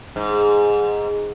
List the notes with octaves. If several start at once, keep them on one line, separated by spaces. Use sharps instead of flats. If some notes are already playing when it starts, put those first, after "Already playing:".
G#2